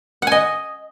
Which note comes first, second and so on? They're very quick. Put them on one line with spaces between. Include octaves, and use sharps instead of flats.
F#5 G#5 D#5